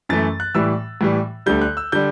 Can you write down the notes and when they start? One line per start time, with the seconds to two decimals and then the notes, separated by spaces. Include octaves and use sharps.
0.09 F#2 E3 A3 A6
0.40 F#6
0.55 A2 E3 G3 E6
1.01 A2 E3 G3
1.46 D2 D3 G3 G6
1.62 F#6
1.77 E6
1.92 D3 G3 G6